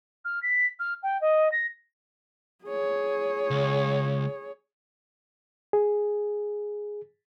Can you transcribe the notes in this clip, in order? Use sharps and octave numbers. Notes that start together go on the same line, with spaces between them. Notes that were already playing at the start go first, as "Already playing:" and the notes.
F6
B6
F6
G5
D#5
A#6
G#4 C#5
C#2
G#4